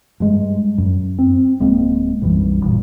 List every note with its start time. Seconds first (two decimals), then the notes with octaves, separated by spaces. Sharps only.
0.20 G2 G#3
0.78 F#2
1.19 C4
1.59 D1 G#3 A#3 C4
2.21 B1 F#2 E3 G3
2.61 G#1 A#2